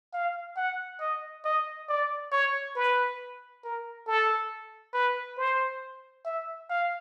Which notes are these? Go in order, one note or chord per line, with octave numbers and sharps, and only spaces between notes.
F5
F#5
D#5
D#5
D5
C#5
B4
A#4
A4
B4
C5
E5
F5